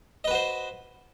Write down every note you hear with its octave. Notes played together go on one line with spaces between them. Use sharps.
F#4 B4 C5 D#5